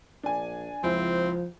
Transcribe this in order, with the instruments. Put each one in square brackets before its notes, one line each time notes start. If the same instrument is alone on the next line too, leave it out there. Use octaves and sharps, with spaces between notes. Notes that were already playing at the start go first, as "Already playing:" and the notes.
[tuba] A#1 [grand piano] D4 G#5
[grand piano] C#2 E4 [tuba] F3 [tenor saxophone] C4